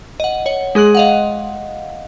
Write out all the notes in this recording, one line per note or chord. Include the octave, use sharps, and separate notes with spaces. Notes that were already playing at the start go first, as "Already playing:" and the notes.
D#5 F#5
C#5 F#5
G#3 G#4 C6 F#6 F#7
D#5 F5 F#5